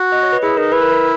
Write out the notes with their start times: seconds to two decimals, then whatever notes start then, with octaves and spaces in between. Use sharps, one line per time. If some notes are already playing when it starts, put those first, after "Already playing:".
Already playing: F#4
0.12 D#5
0.23 C#5
0.32 B4
0.42 E4 G#4
0.57 D#4 A#4
0.72 E4 B4
0.82 A#4
0.92 A#4